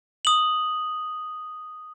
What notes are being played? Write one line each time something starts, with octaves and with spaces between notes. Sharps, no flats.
D#6 F#7